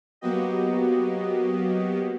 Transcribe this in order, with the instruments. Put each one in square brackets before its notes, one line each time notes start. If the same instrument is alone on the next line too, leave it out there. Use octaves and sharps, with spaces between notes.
[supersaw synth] F#3 A#3 B3 F#4 G4 D#5